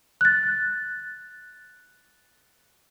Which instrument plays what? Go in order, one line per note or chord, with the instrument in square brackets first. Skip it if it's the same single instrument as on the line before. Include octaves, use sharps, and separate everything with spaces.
[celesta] F#6 A6